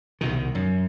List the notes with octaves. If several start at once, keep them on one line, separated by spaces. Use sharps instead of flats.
C2 B2 D#3
F#2